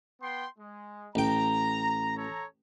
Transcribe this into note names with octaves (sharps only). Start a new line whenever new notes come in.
B3 G5 C6
G#3
A1 G5 A#5
A4 C#5 A#5